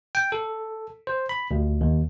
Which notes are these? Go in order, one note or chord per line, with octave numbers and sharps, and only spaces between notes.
G5
A4
C5
B5
D2
D#2